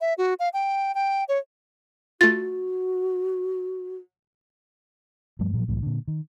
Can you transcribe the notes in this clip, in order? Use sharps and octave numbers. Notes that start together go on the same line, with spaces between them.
E5
F#4
F5
G5
G5
C#5
A3 F4 F#4 A6
G2 F3 G3 A3
A#2 F3 F#3
C2 A2 E3 F#3
A#2 D3
D#3